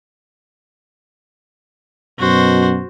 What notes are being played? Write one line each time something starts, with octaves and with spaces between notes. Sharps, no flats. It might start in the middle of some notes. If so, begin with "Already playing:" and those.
F#2 B2 F#4 C5